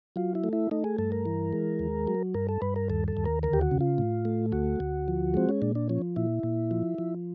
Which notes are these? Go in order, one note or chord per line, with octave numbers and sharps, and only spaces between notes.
F#3 F4
E4
A3
E4
A3 D#4
G#4
G2 A4
A#4
E3
G#3
D#2
F#3
G2 A#4
A4
G2 B4
A#4
D#2 A4
A4
D#2
A#4
D2 A#4
G4
F#4
C#3
F4
A2
A3
D2 F#4
D2
F3
G#3 C4
C#4
A#2 D4
D4
F3 C#4
A#2 E4
A#2
F3
F3